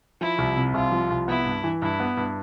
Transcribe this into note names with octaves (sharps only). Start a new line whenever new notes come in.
F3 E4
C2
C3
C2 F4
F3
C2
B3 E4
G2
E3
G2 E4
B3
G2